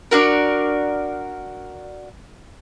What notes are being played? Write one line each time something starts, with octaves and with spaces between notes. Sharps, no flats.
D4 F#4 A#4